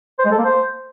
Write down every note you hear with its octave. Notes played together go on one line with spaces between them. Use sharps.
C5
G#3
A4
A#3
C5